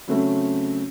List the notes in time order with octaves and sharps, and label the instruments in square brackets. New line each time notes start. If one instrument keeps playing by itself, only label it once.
[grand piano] C#3 F#3 A3 C4